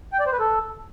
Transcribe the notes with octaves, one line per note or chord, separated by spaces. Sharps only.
G5
D5
C5
B4
A4